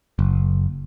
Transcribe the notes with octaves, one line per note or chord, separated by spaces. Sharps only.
F#1